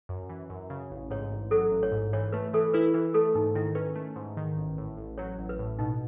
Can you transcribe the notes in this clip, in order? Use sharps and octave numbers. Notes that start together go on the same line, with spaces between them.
F#2
E3
F#2
C#3
A1
G#2 C#5
A1
F#3 A4
A1
C#5
G#2
E3 C#5
A3 B4
E3 A4
E4 B4
E3 B4
A3 A4
G#2 D#4
D#3 E4
C#4 B4
A3
G#2
D#3
A1
A2
A1
F#3 C#5
A1
B4
A2
B2 D#4